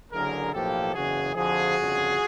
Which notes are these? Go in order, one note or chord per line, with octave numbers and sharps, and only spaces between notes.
F#1 F#2 D3 G#4 A#4
B1 A2 F3 A#3 G4 A4
F#1 E2 C#3 E3 F#4 G#4
F2 D3 F3 F#4 G#4
G1 F2 C#3